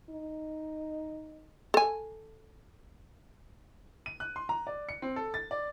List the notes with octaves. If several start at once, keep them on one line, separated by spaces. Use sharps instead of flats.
D#4
A4 G#5
D#7
F#6
C6
A#5
D5
C#7
C4
A4
A6
D5